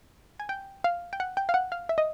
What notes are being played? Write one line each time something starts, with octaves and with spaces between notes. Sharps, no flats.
G#5
G5
F5
G5
F#5
G5
F5
F#5
F5
E5
D#5